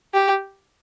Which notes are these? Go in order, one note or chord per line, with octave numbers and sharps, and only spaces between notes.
G4